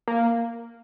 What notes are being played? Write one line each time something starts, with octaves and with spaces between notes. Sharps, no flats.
A#3